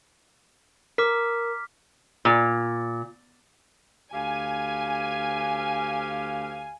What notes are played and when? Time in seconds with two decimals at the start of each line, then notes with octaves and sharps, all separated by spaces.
0.98 A#4 D6 F6 B6
2.25 A#2
4.13 D2 G4 F5 G#5